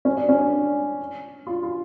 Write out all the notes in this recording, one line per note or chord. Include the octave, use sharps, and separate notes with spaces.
C#4
D4
C#4
D4
F4
F4